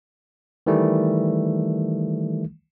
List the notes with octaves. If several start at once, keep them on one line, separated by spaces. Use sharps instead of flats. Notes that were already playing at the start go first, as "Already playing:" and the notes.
D#3 E3 G3 A3